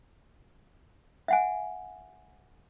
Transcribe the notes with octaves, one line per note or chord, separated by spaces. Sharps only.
E5 F#5 G#5